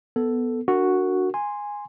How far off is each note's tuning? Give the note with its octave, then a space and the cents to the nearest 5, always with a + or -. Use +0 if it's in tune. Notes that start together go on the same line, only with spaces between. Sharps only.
B3 +0 A4 +0
D4 +0 F#4 +0 A#4 -20
G#5 -10 C6 +0